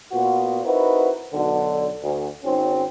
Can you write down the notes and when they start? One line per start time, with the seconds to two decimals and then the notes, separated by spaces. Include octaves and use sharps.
0.12 A#2 B3 F4 F#4
0.64 C4 D#4 E4 F#4 A#4 B4
1.33 B1 D3
2.01 D2
2.43 G#1 C4 C#4